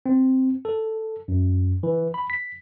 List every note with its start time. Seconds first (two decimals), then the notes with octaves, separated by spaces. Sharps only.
0.06 C4
0.65 A4
1.28 F#2
1.83 E3
2.14 B5
2.30 B6